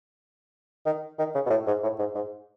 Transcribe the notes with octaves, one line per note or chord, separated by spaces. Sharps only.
D#3
D#3
C#3
B2
A2
G#2
A2
G#2
G#2